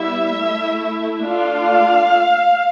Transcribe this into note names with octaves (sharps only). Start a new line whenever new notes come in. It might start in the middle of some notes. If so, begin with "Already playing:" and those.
Already playing: G3 B3 E4 E5
A3 E4
A3 D4 F4 F5